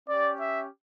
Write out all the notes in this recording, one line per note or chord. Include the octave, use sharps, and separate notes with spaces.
C#4 G4 D5
E5